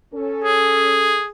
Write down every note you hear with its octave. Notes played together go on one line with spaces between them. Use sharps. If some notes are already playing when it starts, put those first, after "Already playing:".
C#4 A4
G#4